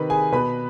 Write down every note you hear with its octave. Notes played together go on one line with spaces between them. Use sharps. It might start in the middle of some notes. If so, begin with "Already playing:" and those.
Already playing: C3 D#3 B4 B5
G#4 G#5
B2 B4 B5